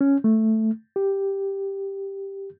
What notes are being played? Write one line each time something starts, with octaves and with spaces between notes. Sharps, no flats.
C#4
A3
G4